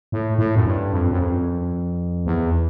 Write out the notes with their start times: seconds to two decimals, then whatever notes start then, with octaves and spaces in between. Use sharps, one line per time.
0.12 A2
0.38 A2
0.55 F#2
0.66 G2
0.92 F2
1.11 F#2
1.19 F2
2.26 E2